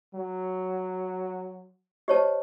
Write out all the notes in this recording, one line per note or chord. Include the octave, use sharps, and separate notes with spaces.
F#3
G4 C5 C#5 D#5 A5